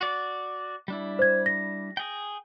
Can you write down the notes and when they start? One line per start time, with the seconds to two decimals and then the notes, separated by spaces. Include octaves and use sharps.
0.01 F#4 D5
0.88 G3 D4 E4
1.19 C5 G#6
1.46 A#6
1.97 G#4 G5